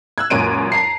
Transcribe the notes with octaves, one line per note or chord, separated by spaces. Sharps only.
E6 F#6 G#6
C#2 F#2 A#2 C#5 D7 D#7
A5 A#5 C7